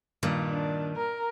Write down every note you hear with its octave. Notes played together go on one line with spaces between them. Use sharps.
G2 A#2 D#3
D4
A#4